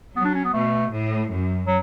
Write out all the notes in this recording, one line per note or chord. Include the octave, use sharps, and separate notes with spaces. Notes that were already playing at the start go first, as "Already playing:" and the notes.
F#3 B3
D4
C#4
B3
B2 A3
A2
F#2
F#3